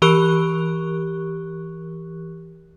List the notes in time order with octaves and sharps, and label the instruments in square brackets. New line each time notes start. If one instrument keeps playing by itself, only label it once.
[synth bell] E3 G4 A#4 C#6 F#6